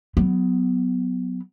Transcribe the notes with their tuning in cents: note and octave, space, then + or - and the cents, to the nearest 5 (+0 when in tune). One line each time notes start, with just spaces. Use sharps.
F#3 +0 B3 +15